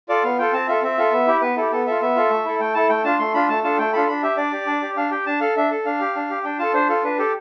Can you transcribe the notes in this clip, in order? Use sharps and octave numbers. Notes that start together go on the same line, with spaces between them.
F4 A4 D5
B3 F5
F4 A4 G5
C4 A5
F4 A4 E5
C4 E5
F4 A4
B3
E4 G4
B3 B4
E4 G4 A4
B3 A4
F4 A4 E5
B3 E5
F4 A4
A3
E4 A4
A3 G5
E4 A4 A5
A3 G5
D4 F4 A5
A3 C6
D4 F4 B5
A3 A5
D4 F4 A4 A5
A3 G5
D4 F4 A4 B5
D4 B5
G4 E5
D4 D5
G4
D4
G4
D4 F5
G4 G5
D4 A5
A4 F5
D4 E5
A4
D4 F5
G4
D4
G4
D4 G5
F4 A4 A5
D4 C5
F4 A4
D4 B4
G4 A4